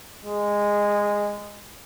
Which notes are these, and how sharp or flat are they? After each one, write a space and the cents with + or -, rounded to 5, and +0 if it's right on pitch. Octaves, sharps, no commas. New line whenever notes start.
G#3 -15